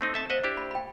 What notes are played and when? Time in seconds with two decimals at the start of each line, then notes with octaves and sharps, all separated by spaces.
0.01 A3 C4 D#4
0.14 A4 E5 A5
0.30 C5 D#5 E5 F#5
0.44 D4 E4 G4
0.57 B5
0.71 G5 B5